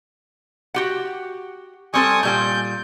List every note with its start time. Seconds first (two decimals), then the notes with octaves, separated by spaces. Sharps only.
0.74 F#4 G4 F#5
1.94 G3 C4 A4 G#5 C#6 D#6
2.23 A#2 G3 G#5 G6